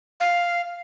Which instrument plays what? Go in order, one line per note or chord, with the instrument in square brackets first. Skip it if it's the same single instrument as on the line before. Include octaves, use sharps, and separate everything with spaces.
[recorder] F5